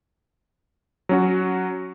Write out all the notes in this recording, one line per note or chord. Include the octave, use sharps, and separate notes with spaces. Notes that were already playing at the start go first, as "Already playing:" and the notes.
F#3 C#4 F#4